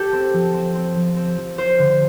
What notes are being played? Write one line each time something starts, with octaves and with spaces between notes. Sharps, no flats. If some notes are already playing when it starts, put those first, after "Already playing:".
Already playing: G4 A4
C4
F3
C4
C4
F3
C4
F3
F4 C5
D3